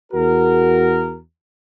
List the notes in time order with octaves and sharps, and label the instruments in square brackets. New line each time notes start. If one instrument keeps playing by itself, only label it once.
[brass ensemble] E2 F#4 A#4